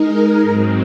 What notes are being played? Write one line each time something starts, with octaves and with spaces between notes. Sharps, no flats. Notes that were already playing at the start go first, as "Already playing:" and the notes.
Already playing: G#3 D#4 A#4
G#2 F#3 C4